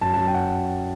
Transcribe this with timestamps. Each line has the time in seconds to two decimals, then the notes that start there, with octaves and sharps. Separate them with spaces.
0.01 F#2 A5
0.13 F#2 A5
0.27 G5
0.34 F#5